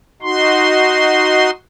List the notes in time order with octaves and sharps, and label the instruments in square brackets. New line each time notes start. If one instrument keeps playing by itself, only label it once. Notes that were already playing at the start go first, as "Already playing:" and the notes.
[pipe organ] D#4 F#4 C6